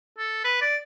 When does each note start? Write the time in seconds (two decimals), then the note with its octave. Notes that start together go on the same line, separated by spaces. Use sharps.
0.18 A4
0.45 B4
0.61 D5